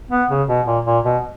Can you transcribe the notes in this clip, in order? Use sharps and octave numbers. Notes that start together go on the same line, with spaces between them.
B3
C#3
B2
A#2
A#2
B2